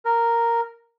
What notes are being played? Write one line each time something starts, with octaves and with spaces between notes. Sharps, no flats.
A#4